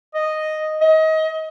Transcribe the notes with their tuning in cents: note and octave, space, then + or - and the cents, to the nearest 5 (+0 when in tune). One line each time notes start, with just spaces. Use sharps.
D#5 -5
D#5 +30